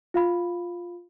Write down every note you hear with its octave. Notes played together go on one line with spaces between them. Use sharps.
F4 F5 B5